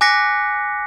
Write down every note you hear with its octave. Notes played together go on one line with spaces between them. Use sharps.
G#5 D6 F#6 A#6 B6 C#7